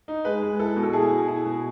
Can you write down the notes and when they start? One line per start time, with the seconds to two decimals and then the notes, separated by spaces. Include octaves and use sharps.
0.08 D#4
0.25 G#3 B4
0.42 G#3
0.59 E4 A4
0.76 B2
0.83 A4
0.93 E4 G#4
1.10 B2
1.28 E4
1.46 B2